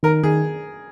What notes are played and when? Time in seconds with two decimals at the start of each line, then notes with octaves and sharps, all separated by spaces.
0.03 D#3 A#4
0.23 D#3 G#4